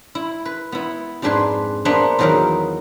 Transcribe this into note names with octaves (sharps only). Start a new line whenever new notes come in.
E4
B4
B3 E4
F2 G#2 D4 B4 G#5 C6
A#3 B3 D4 C5 E5 F#5
E2 D#3 F#3 A#4 B4 F5